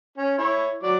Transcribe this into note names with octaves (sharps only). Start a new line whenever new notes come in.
C#4
E4 C#5
F#3 D5 D6